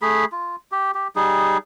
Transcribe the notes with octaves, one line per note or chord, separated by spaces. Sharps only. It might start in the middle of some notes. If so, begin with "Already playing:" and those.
A3 G#4 B5
F4
G4
G4
G3 D#4 G#4